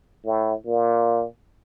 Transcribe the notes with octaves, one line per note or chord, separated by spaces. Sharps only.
A2
A#2